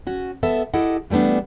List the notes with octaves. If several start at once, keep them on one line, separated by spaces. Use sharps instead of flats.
C#4 F#4
B3 A4 E5
E4 G4 A4 D#5 F#5
E3 G3 A3 B3 D4